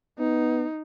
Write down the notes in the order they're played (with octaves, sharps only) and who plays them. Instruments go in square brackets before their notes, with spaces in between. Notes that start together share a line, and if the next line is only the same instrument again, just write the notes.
[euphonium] B3 [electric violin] D#4